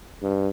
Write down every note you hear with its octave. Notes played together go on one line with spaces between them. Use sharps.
G2